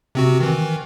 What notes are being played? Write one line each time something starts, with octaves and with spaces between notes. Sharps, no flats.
C3 C4 F#4
D#3 E3